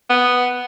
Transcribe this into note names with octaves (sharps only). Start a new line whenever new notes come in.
B3